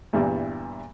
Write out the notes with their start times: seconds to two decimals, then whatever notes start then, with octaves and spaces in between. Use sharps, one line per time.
0.13 E2 G2 A#2 E3 G3